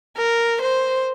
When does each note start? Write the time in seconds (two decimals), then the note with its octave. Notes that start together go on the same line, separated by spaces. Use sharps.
0.18 A#4
0.61 C5